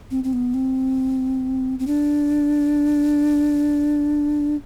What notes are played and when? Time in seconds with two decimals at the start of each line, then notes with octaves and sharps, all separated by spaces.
0.11 C4
0.24 C4
0.33 B3
0.54 C4
1.79 C4
1.87 D4